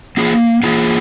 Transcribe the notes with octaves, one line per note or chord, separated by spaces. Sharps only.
A#3 F4 G#4
A#3 F4 G#4